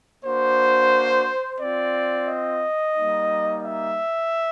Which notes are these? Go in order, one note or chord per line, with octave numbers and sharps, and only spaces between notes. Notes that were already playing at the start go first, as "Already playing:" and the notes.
A#3 D4 F#4 C5
C4 F4 D5
D#5
G3 A#3 D#4
E5